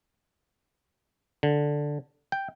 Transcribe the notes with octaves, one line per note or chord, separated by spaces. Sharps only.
D3
G5